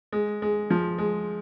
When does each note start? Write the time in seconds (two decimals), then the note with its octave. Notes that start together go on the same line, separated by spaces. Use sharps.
0.12 G#3
0.42 G#3
0.70 F3
0.98 G#3